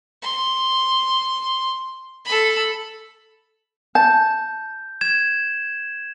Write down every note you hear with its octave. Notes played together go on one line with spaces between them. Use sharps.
C6
A4 B5
A5 G6
G#6 E7